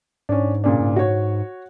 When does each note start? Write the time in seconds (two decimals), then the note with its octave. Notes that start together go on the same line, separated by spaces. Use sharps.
0.29 G#2 C#4 D4
0.64 A#2 C#3 D4
0.80 G#2
0.96 F#4 C#5